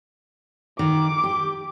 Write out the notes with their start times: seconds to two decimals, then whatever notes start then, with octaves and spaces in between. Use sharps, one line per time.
0.79 D#3 D6
1.24 G4